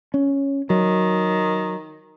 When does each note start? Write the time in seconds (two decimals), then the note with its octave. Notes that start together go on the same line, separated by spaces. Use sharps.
0.14 C#4
0.70 D#3 F#3